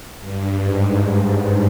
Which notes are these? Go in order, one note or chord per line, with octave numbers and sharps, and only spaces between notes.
G2
G#2